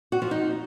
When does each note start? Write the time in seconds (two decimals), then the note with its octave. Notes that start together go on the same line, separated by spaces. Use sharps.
0.12 F#4
0.22 F3
0.31 D#4